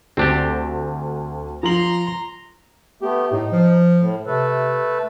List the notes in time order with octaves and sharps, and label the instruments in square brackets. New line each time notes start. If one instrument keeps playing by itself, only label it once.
[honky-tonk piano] D2 [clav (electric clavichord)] C4 D4 G4
[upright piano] F3 F#7 [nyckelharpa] A#5 C6
[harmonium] A3 B3 [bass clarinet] G4
[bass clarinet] A2 [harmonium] D#4
[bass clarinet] F3
[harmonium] A2
[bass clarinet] C3 [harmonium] A3 A4 B4